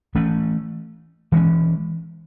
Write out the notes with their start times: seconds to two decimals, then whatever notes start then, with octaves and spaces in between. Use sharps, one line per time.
0.15 E3 A3 C#4
1.32 E3 G#3 C#4